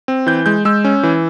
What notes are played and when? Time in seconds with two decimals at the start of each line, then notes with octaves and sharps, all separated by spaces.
0.08 C4
0.26 E3 G6
0.46 G#3 G6
0.65 G#3 E6
0.84 C#4
1.03 E3